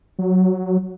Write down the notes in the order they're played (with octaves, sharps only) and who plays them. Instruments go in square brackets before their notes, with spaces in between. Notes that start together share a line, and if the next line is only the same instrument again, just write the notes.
[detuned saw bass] F#3